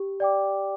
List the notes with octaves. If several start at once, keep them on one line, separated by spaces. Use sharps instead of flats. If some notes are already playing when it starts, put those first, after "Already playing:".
Already playing: G4
D5 G5 D6